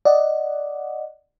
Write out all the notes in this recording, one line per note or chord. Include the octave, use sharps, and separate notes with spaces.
D5 D#5 F#5